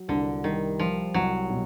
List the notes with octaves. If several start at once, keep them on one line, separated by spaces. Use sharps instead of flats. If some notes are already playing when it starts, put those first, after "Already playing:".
Already playing: F#3
C2 D3
D#3 G3
F3 G3
C2 F#3
B2